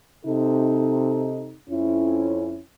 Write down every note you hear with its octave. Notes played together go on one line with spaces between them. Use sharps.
C3 D#4 A4
F2 C#4 E4